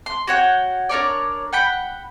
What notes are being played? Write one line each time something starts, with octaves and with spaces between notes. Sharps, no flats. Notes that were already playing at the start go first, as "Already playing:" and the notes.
C6
F#4 C#5 F#5 G5
D4 A#4 C#5 D5
F#5 G5 B5